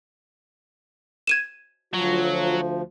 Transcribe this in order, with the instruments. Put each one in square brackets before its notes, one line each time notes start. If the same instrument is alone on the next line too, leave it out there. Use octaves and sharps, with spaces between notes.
[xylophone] G#6 D#7 E7
[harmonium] D2 F3 [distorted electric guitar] F#3 [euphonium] F4